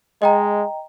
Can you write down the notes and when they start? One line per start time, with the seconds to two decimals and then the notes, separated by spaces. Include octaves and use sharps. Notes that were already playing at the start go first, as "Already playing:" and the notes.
0.22 G#3 D#5 G5 A#5